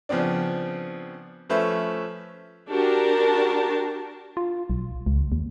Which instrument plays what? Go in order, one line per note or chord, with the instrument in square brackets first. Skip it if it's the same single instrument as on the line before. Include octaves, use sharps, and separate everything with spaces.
[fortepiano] C#3 F3 B3 C4 D4
F3 A3 C#4 B4 C5 E5
[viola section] D4 F#4 G4 A#4 A5
[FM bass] F4
B1
C#2
D#2